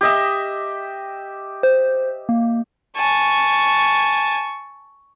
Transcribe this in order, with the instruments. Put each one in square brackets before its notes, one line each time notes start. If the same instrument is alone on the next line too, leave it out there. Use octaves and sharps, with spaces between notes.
[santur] G4 D#5 E5
[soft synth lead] C5
A#3
[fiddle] G#5 A5 [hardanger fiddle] C#6